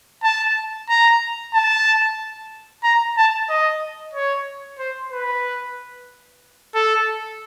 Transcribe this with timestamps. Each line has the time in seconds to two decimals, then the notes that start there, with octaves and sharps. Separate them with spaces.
0.23 A5
0.89 A#5
1.54 A5
2.84 A#5
3.17 A5
3.49 D#5
4.14 C#5
4.79 C5
5.12 B4
6.75 A4